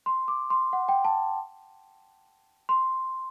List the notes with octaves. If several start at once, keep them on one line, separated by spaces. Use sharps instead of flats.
C6
D6
C6
F#5
G5
A5
C6